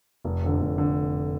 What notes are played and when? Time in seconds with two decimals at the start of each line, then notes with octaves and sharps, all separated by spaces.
0.25 F1
0.43 F2 D3
0.61 F1
0.78 D3